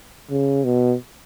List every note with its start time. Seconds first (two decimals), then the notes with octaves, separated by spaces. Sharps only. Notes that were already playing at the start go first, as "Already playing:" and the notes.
0.30 C#3
0.65 B2